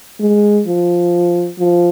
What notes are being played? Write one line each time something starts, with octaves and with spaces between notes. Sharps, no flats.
G#3
F3
F3